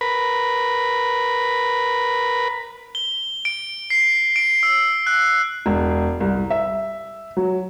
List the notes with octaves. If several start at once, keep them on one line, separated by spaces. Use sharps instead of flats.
A#4 B4 B5
G7
D7
C7
D7
E6
F#6
E1
C2
E5
F#3